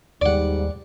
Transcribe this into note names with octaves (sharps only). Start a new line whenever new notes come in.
D#2 G#2 G3 D5 F#5